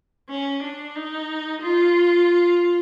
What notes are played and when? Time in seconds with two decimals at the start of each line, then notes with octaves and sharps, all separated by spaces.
0.30 C#4
0.63 D4
0.95 D#4
1.62 F4